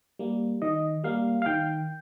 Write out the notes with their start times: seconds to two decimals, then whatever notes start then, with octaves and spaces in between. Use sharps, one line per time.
0.19 G3 A#3
0.62 D#3 D#5
1.04 G3 A#3 F5
1.42 F5
1.46 D#3 G5